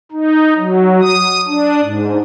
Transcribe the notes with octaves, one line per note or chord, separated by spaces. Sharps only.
D#4
F#3
D#6
D4
G#2